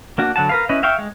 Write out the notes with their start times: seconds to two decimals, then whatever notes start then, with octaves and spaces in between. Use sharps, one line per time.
0.18 A#3 D4 F#4
0.36 D3 F#3 F#5 A5
0.49 A#4 B4 F5
0.69 C#4 E4 B4 D#5
0.83 E5 F5 G5 C#6
0.98 G#3